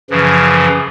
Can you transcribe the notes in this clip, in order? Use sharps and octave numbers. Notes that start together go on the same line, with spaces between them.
F#2 C#3 E3 F3